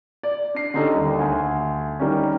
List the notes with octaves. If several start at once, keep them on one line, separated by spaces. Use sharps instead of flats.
D5
D4 C7
D3 C#4 D#4 G4 A4
D#2 G3
D2 G#5
D#3 G3 C#4